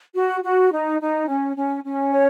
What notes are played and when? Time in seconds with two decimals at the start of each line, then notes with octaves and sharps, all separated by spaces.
0.14 F#4
0.42 F#4
0.71 D#4
0.99 D#4
1.28 C#4
1.56 C#4
1.84 C#4
2.12 C#5